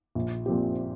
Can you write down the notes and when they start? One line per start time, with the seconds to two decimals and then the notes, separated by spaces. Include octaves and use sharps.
0.15 A#1
0.46 A#2 F3 C4 G4